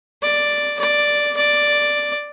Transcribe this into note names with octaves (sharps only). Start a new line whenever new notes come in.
D5
D5
D5